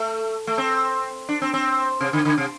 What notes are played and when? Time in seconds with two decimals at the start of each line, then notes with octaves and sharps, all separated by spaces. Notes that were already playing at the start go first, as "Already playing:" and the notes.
Already playing: A3
0.47 A3
0.58 C4
1.29 D4
1.42 C4
1.54 C4
2.01 C3
2.13 D3
2.25 D3
2.38 C3